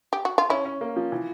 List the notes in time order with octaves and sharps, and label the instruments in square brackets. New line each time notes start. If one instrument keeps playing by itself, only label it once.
[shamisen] G4
F#4
F4
[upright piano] C#4 [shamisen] E4
[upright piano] C#4
A#3
F3
E3